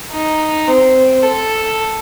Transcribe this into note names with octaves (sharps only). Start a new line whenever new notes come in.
D#4
C4
A4